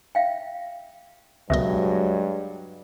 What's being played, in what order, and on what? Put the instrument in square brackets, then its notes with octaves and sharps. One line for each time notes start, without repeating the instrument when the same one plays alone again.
[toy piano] E5 F5 G5
[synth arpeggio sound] C#2 B2 D#5 [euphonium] G2 [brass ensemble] F#3 G#3 [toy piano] E5